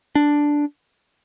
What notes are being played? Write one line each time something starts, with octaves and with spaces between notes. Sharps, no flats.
D4